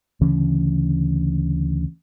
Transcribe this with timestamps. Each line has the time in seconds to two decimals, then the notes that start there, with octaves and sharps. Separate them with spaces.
0.21 D2 C#3 E3 C#4